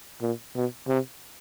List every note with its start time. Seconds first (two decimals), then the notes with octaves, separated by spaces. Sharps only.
0.22 A#2
0.55 B2
0.88 C3